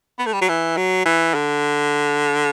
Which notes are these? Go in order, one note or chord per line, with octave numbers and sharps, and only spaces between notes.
B3
A3
G3
F#3
E3
F#3
E3
D3